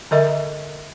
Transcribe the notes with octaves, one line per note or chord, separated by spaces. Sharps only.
D3 A#4 D#5 E5